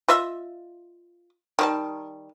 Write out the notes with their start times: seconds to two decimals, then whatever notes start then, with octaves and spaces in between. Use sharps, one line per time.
0.08 F4 D#5 E5
1.59 D#3 G3 A5